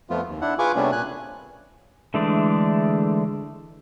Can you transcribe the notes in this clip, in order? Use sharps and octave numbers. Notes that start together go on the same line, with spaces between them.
F2 F3 A3 B3 F4
D#2
D4 E4 F#5
F4 G#4 B4 G#5 C#6 D6
C3 G3 A3 B3 C#4 D4
A#2 G#5 F#6
D3 E3 G#3 A3 D4